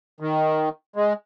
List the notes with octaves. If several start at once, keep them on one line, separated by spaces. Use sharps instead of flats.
D#3
G#3